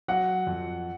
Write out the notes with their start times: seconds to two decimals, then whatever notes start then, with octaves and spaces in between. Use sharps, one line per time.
0.08 F#3 F#5
0.47 F2